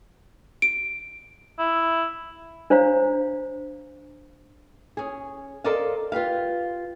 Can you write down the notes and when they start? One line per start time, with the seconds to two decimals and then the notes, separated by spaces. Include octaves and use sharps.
0.62 D7
1.59 E4
2.70 D4 C5 C#5 F5 A#5
4.97 C#4 G#4
5.64 A4 A#4 C5 D5 D#5 F5
6.12 F4 G4 B4 F5